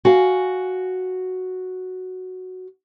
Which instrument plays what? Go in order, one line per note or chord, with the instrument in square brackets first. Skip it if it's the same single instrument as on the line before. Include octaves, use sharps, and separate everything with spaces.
[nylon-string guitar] F#4 F5 G#5